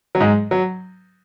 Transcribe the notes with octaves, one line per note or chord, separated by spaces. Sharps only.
F#3
G#2 G#3
F#3